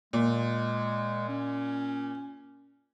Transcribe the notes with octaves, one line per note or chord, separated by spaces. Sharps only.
A#2 G#3
C#4